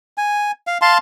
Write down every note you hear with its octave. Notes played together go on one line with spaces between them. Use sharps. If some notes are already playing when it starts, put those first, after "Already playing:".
G#5
F5
F5 A5 C6